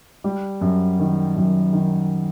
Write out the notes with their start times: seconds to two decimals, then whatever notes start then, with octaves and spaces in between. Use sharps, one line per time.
0.24 G3
0.61 F#2
0.99 D#3
1.36 F#2
1.73 D#3